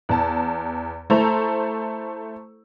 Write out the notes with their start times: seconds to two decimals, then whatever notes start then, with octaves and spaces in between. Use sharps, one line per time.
0.09 E2 A5
1.10 A3 E4 A4 C5 A#5 F7